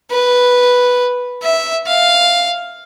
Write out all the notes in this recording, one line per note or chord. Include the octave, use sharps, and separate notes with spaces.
B4
E5
F5